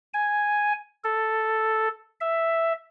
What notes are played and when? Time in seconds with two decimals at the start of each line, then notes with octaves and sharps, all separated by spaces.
0.14 G#5
1.04 A4
2.21 E5